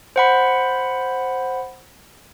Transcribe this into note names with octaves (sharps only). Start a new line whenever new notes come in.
C5 F#5 B5